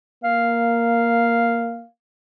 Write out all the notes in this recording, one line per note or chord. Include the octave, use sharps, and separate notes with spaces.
A#3 F5